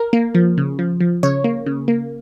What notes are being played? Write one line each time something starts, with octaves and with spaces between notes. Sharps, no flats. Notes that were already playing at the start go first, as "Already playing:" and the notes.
Already playing: A#4
A#3
F3
C#3
F3
F3
C#3 C#5
A#3
C#3
A#3